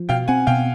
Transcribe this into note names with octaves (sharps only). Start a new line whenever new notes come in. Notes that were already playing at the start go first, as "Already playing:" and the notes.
Already playing: F3
B2 F5 G5
C4 F#5 G#5
B2 F5 G5